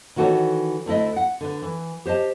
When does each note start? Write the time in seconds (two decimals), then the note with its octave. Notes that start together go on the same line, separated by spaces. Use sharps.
0.16 D#3 E3 F#4 A4 B4 C#5
0.86 D2 A3 E4 D#5
1.16 F#5
1.41 D3 B4
1.62 E3
2.05 G4 C5 D#5 A5